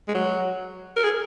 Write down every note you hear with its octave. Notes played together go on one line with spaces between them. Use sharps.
G#3
F#3
A#4
G#4